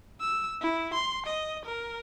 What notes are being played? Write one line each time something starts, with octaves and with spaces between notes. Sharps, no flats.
E6
E4
C6
D#5
A#4